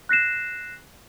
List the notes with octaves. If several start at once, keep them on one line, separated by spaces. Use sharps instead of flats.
F#6 A#6 C7 E7